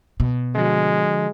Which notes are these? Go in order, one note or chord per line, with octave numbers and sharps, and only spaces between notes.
B2
D3 F3 G#3 F#4